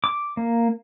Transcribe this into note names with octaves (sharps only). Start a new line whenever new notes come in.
D6
A#3